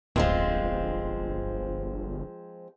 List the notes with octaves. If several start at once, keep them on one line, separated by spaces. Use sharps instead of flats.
D1 G1 F3 G#3 C4